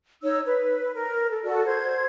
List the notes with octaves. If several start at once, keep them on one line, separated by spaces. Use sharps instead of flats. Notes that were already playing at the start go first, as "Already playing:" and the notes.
D#4 C#5 E6
B4
A#4
A4
F#4 A4 D5
C5 G#6